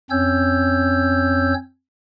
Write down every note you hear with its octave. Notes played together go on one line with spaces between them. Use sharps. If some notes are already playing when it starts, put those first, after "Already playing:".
F2 C4 C#4 C#5 E6 G6